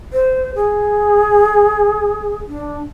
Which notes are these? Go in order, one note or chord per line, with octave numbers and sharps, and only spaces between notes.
C5
G#4
D4